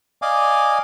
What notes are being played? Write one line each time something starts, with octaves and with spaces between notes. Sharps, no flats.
D5 D#5 F5 G#5 D6